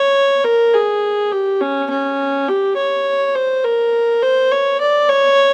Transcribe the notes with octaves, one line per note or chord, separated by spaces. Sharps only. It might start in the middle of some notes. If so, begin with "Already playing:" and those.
Already playing: C#5
A#4
G#4
G4
C#4
C#4
G4
C#5
C5
A#4
C5
C#5
D5
C#5